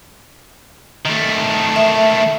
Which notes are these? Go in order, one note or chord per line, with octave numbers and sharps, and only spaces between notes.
D#3 A3
E5